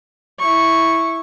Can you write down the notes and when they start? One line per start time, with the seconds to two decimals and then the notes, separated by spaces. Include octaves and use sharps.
0.39 E4 C#6